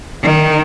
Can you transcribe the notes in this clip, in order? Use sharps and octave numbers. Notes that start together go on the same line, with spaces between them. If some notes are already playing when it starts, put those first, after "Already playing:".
D#3